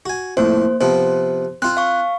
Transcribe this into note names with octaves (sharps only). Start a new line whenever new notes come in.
F#4 G#5
F2 A2 A#3 C5
C3 F3 B3 C5
C4 F4 F#6
F5 C#6